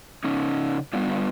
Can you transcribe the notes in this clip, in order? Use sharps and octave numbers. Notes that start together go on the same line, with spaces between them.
C#3 C#4 D#4
G2 G3 B3 D4 F4